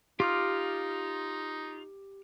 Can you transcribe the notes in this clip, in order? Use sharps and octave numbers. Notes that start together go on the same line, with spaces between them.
D#4 F4 G4 D6 F6